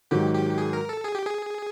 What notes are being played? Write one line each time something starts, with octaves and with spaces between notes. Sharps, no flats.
G#2 D#3 F#3 G4
G4
G#4
A#4
A4
G#4
G4
G#4